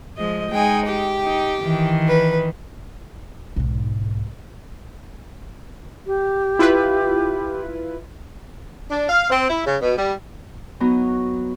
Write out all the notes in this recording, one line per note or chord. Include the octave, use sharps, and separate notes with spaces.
F3 G#3 D#5
G#3 D#4 G5 G#5
G4 G5
D#4
D#3 E3
B4
B1 G#2
G4
E4 F4 B4
D4
F5
C4
E4
C#3
B2
G3
F#3 B3 D#4 F#4